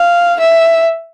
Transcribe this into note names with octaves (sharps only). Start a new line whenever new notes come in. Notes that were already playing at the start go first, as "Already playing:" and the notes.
Already playing: F5
E5